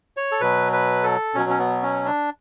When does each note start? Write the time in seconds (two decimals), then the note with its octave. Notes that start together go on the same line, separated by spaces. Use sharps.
0.17 C#5
0.32 A4
0.41 B2 F#3 B4
0.73 B4
1.03 A4
1.35 B2 F#3 C#4
1.50 C#4
1.59 B3
1.83 C#4
2.05 D4